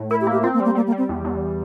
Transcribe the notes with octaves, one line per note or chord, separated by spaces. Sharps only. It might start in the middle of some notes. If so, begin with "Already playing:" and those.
Already playing: A2
E4 A#4
G4
A#3
G4
C4 F4
A#3
G3
A#3
G3 A#3
A#3
G3
C4
E2
E2